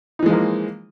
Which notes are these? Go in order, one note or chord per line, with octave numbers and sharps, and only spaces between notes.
E3 F3 G#3 A#3 D#4